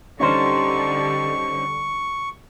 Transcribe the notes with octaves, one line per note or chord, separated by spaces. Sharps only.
D3 G3 C#4 D#4 C5 C#6